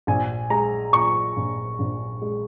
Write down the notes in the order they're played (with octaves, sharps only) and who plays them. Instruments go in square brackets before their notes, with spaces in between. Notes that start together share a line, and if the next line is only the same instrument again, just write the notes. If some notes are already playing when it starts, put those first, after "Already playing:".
[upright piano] A#1 [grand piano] G#5
[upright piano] G#3 [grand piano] A#5
[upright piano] A#2 [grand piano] C#6
[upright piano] A#1
A#1
G#3